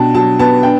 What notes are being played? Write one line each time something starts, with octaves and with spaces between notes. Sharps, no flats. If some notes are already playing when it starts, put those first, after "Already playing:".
Already playing: B2 D4 G5 A5
F#3 A5
B3 A5
D4 G5